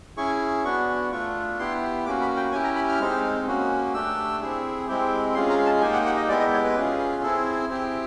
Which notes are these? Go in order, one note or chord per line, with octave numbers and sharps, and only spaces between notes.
C#4 E4 G#4 C#6
B3 D4 F#4 C#6
A3 D4 F4 C#6
B3 E4 G4 C6
A#3 C#4 F#4 D6
B5
G5
C#4 E4 G4 G#5
A#5
B5
F6
G#3 C4 D#4
A#3 C#4 F#4
A3 D4 G4 E6
C4 E4 G#4
G#3 C4 E4 G4
G#3 C#4 F4 G#4 C6
A#5
A5
A#3 D#4 G4 G#5
F#5
F#5
D#5
G#3 B3 E4 G4 D5
D#5
C#5
B4
C#4 F4 G#4
C4 E4 G#4 A4
C4 E4 G4 G#4